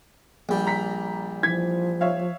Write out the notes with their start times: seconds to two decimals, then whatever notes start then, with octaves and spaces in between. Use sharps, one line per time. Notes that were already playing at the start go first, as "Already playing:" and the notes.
0.49 A#1 G3
0.67 A#5 B6
1.43 E3 F3 G#6 B6
2.01 C#5 E5 F5